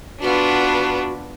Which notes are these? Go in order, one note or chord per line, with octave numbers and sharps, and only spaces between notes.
B3 D4 F4 F#4 B4